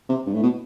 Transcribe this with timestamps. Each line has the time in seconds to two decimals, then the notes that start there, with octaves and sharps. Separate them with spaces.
0.09 C3
0.26 G2
0.34 A2
0.43 B2